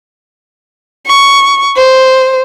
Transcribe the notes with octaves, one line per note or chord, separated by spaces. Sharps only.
C#6
C5